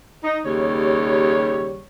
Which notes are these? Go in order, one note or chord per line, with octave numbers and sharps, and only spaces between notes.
D#4
D#2 C#3 G3 C#5